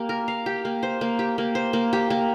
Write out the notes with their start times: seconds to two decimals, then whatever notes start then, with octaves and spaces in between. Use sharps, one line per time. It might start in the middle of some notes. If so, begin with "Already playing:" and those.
Already playing: A#3 G4
0.09 A#4
0.28 F5
0.46 G4
0.65 A#3
0.83 C5
1.01 A#3
1.19 G4
1.38 A#3
1.55 C5
1.73 A#3
1.93 G4
2.10 A#3